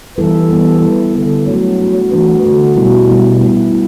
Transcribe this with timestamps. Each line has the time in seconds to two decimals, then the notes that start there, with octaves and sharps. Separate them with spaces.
0.17 E3 G3 B3 E4 A4
0.50 G3 B3 E4 A4
0.82 G3 B3 E4 A4
1.15 D3 G3 B3 E4 A4
1.47 F#3 A3 D4 F#4
1.78 A3 D4 F#4
2.11 E3 A3 D4 F#4
2.43 D3 A3 D4 F#4
2.75 B2 G3 B3 E4
3.08 G3 B3 E4
3.40 G3 B3 E4
3.72 E4